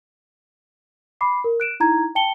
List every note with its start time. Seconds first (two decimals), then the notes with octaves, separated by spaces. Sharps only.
1.21 B5 D6 C7
1.44 A#4
1.60 F#6 D7 E7
1.80 D#4 E4 A#5 G#6
2.15 G5 A5 C#7 G7